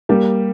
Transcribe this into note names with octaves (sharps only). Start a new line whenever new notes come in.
G3 A#3 G4